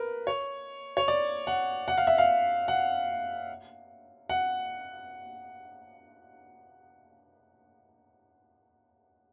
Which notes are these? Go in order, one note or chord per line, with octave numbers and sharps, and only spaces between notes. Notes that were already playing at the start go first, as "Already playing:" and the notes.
Already playing: A#4 B4
C#5
C#5
D5
F#5
F#5
F5
E5
F5
F#5
F#5